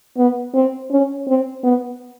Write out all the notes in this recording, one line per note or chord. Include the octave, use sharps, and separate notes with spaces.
B3
C4
C#4
C4
B3